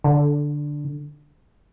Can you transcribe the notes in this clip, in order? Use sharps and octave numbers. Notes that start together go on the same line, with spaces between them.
D3